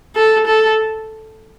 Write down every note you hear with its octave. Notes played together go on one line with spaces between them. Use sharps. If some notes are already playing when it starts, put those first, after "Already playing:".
A4
A4